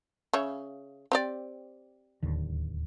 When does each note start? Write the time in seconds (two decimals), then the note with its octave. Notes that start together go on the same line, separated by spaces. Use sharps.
0.33 C#3 C#5 E5
1.12 C4 G4 D5
2.23 D1 D#2 D3